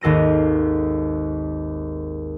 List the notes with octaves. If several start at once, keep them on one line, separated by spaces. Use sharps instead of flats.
G#1 D#2 A4 A#6 D#7